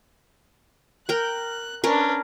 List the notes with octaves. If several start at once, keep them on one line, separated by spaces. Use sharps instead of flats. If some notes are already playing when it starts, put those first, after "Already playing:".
A#4 G5 F#6
C#4 D4 A#4 B4